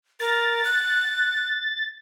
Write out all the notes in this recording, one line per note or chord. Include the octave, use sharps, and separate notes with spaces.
A#4 A6
F#6